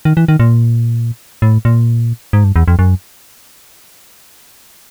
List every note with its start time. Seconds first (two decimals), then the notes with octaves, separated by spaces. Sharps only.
0.05 D#3
0.17 E3
0.28 D#3
0.40 A#2
1.42 A2
1.65 A#2
2.33 G#2
2.44 G2
2.56 E2
2.68 F2
2.79 F#2